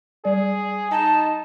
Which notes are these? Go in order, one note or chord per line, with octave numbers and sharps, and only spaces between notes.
G3 G#4 D5
D#4 A5